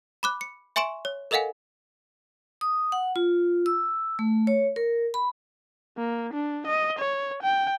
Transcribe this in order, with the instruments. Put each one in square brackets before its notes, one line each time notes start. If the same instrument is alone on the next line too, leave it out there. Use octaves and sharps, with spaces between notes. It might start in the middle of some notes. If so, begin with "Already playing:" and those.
[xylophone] B5 D6 F#6
C#7
E5 G#5 C6 C#6 D7 E7
C#5
A4 A#4 D#5 F5 F#5 G#5
[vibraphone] D#6
F#5
F4
E6
A3
C#5
A#4
B5
[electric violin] A#3
D4
D#5
C#5
G5